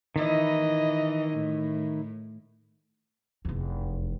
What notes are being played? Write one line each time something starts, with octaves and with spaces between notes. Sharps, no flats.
D#3 E3 E4 D#5
A2
F1 E2